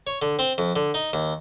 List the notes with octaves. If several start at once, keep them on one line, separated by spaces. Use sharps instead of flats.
C#5
D3
C4
F2
D3
D#4
D#2